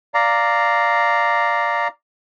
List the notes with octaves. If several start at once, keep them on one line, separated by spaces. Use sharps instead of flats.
D5 F5 A#5